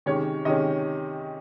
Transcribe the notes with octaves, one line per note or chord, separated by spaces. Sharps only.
C3 D#3 G#3 C#4 C#5
C3 D#3 G#3 C#4 D#5